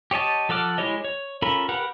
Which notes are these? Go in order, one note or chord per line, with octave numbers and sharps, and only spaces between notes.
G4 C#5 D#5 A5
F3 A4 F#5 D6 F6
G#3 E4 G4 C#5 D#5
C#5
C#4 F4 A4 A#4 B5
G4 A#4 B4 F#5 B5